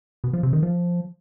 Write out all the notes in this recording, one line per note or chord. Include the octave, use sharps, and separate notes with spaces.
B2
F3
C3
D#3
F3